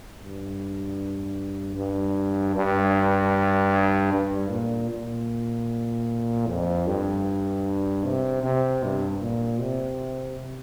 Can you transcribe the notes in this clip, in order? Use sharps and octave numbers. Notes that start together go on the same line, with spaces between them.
G2
G2
G2
G2
A#2
A#2
F2
G2
C3
C3
G2
A#2
C3